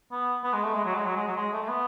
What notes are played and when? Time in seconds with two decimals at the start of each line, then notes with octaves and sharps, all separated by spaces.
0.12 B3
0.44 B3
0.53 G#3
0.64 A3
0.74 G#3
0.85 F#3
0.95 G#3
1.05 F#3
1.16 G#3
1.27 F#3
1.37 G#3
1.52 A3
1.62 A3
1.68 B3